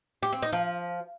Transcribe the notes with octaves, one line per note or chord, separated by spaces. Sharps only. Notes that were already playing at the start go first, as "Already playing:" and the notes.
G4
C4
D#4
F3